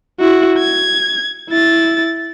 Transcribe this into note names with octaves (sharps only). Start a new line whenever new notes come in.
E4 F#4
G#6
E4 A6